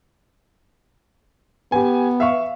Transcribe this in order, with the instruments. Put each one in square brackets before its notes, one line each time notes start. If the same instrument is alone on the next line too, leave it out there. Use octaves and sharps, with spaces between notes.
[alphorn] B3 [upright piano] G4 G#5
[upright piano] E5 F5 C#6